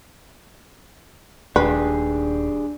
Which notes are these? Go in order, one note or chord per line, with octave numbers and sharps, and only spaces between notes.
D#1 D#2 A3 D4 G4 G#4 B4